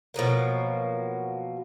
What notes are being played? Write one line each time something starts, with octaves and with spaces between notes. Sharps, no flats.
B2 F3 F#3 A#3